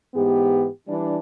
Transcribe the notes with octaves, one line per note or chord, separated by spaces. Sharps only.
G#2 E3 B3 G4
E3 G3 D4